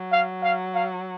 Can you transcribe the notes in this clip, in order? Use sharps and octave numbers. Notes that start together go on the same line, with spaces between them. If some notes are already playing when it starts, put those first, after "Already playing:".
Already playing: F#3
F5
F5
F5